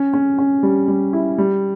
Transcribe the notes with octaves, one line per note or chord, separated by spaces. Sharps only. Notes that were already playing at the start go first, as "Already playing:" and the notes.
Already playing: C#4
C#4
C#4
G3
G3
E4
G3